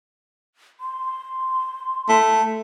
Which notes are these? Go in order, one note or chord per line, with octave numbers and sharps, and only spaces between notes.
C6
A3